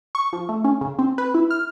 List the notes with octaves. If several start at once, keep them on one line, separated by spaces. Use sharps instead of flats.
C#6
F3
A3
C#4
C#3
C4
B4
E4
F6